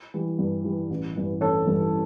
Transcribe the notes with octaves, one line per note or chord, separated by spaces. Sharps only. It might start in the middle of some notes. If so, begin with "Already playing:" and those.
E3 G3
G2
E3 G3
A1
G2 E3
A1 A4 C#5
G2 E3